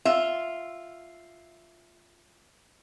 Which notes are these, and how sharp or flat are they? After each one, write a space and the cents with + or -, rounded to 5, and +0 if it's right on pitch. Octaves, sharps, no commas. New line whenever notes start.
F4 +0 E5 +0